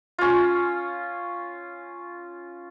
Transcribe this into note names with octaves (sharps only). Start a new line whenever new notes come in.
C#4 F4